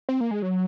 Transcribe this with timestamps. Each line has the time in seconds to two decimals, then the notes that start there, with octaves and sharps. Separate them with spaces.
0.09 C4
0.21 A#3
0.31 G#3
0.42 F#3